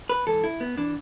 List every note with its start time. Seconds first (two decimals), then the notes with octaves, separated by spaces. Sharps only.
0.09 B4
0.27 G#2 E3 A4
0.44 E4
0.60 B3
0.77 E3 D4